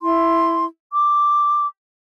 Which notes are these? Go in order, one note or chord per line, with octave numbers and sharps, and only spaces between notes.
E4 C6
D6